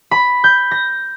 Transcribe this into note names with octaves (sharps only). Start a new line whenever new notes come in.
B5
G6
A#6